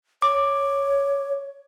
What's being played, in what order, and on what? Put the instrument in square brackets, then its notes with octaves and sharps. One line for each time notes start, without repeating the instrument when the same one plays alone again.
[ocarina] C#5 [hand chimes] D6